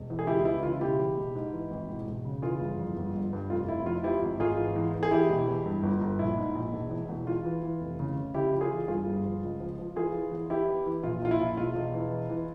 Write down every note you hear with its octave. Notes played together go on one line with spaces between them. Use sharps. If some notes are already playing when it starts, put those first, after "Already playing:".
Already playing: E1
E2
G#4
C#2 E4 G4
E3 E4
C#3 F4
E1 E4 G4
E2
E1
G#2
E3
G#1
E1
E1
C#3
E3 F4 G#4
G1
F2
G1
G1
G2
F1 F4
F1 E4
F2 F4
F3 E4 G4
G#1
G#1 F4 G#4
E3
E2
E3
G#4
E2 E4 G4
E1
E2
G2
G1
G1
A#1 E4
G#2
A#1
E1
E2
E1
E2 F4
E3
E3
F1
C#3
C#3
C#3 E4 G4
F3
F4 G#4
E2
G2 F4 G#4
G1
F3
C#2
F3
F3
E3 F4 G#4
E3
E2
E2 E4 G4
E3
E3
A#1 F4
A#1 F4
E4
A#1
E1 F4
E1
E3
E3
E3